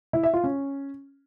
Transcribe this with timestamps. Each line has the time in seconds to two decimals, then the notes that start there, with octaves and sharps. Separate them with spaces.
0.13 E4
0.23 E5
0.34 F4
0.44 C#4